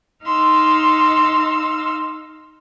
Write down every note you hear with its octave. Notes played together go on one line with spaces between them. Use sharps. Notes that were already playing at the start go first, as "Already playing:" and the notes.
D#4 F5 C6 E6